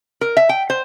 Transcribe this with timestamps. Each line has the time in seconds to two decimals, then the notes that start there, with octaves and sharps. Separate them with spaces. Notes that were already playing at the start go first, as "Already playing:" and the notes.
0.21 A#4
0.37 E5
0.49 G5
0.70 C5